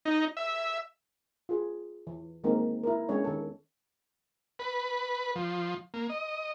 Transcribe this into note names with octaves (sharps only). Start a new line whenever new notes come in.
D#4
E5
F4 G#4
E3
D#3 G#3 A#3 C4 D#4 A#4
E4 A#4
G#3 B3 C#4 D4 C#5
D#3 A4
B4
F3
A#3
D#5